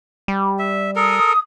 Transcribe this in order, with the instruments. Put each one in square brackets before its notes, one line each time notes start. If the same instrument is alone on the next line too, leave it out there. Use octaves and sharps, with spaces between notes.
[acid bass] G3
[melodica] E5
[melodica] A4 A#4 [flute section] D#6